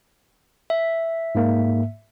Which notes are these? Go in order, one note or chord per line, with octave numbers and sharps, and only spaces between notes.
E5
G#2 A#3